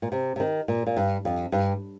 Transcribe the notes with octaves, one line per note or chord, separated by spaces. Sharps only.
A#2
C3
C3
D#3
A#2
A#2
G2
F2
G2